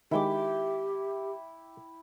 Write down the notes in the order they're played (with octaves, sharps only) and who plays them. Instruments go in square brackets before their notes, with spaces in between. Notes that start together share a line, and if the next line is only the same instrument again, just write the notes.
[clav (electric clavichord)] D#3 G#3 [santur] E4 G5 D6 [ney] G4